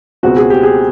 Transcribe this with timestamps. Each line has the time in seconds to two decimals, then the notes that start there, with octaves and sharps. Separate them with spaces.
0.23 C#2 B2 G#3 C4 F#4
0.37 G#4
0.50 G4
0.63 G#4